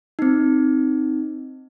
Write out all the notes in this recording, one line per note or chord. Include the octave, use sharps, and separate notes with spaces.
C4 D#4